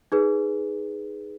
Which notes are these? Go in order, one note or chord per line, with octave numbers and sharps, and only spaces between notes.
D#4 G#4 B4